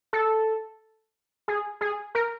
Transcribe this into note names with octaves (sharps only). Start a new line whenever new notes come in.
A4
G#4
G#4
A#4